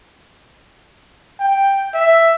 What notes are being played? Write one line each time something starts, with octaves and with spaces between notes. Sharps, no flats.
G5
E5